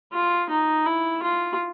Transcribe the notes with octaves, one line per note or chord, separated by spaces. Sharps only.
F4
D#4
E4
F4